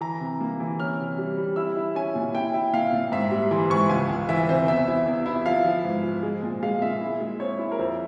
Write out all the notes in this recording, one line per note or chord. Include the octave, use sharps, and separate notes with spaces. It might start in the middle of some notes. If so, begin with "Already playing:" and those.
E3 A#5
C3
A#3
E3
C#4 F6
C3
G3
G3
E4 E6
E4
C#4 G#5
A#2
E4 G5
E4
A#2 F5
A#2
G#2 E5
G3
E3 C6
G#2 C#6
C#2 G#5
C#2
E3 E5
C3 C5
E2 E5
E4
E2
E4
F3 F5
F3
G#2
F3
G#3
A#2
G#3 F5
A#2 E5
E4
G#3
C4 C#5
E4
A#4
F2 C5